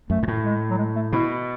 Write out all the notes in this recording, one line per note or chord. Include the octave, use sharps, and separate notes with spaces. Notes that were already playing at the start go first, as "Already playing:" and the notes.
F#2 A3
G#2
A2
G#3
F#3
G#3
A3
B2 E4